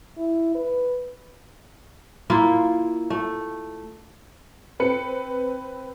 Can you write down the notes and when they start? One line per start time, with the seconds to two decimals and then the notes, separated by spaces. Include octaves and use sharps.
0.17 E4
0.55 B4
2.30 A#3 E4 F4
3.10 A3
4.80 C4 B4 C#7